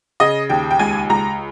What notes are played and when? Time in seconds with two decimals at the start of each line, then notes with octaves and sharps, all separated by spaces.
0.20 C#3 D#5
0.49 D#2 G5
0.70 G5
0.79 C#2 G#5
1.09 C#2 A#5